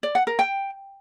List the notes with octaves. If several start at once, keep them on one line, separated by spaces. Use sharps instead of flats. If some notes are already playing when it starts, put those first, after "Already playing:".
D5
F#5
A#4
G5